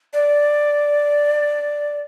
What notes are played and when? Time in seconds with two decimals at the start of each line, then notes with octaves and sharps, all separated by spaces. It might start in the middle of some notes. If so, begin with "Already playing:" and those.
0.13 D5